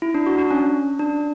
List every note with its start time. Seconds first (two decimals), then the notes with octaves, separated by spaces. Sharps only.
0.02 E4
0.15 D4
0.26 F#4
0.38 D4
0.51 C#4
0.99 D4